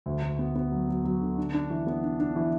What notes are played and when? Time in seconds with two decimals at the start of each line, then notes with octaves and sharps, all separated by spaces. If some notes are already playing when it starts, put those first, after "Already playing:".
0.06 D2
0.22 D2
0.39 B3
0.56 B3
0.72 F#3
0.88 F#3
1.05 F#3
1.21 D3
1.37 D4
1.54 D4
1.70 E3
1.87 B3
2.03 D4
2.20 D4
2.36 E3